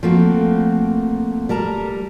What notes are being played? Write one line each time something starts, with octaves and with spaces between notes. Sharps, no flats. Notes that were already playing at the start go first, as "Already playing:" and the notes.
F3 A3 A#3 C4 F#4
G3 A#4 A5 A#5